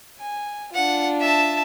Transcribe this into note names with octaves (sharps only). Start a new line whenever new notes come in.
G#5
D4 F4 F#5
E5 A5